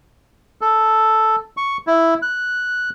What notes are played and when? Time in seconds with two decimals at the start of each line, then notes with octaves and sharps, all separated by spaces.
0.61 A4
1.57 C#6
1.87 E4
2.22 F#6